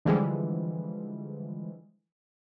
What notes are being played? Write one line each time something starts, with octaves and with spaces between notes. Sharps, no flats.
D3 E3 F3 G3 G#3